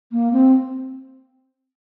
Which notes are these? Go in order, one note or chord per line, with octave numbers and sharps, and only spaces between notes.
A#3
C4